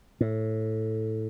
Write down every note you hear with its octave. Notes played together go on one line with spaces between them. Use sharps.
A2